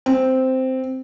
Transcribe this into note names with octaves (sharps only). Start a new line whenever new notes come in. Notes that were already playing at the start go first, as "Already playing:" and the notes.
C4